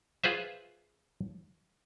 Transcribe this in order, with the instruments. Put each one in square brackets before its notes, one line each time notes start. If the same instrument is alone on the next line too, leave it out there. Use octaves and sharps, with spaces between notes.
[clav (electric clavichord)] F4 G#4 B4 C5 E5